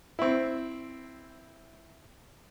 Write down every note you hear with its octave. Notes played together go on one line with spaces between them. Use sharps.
C4 E4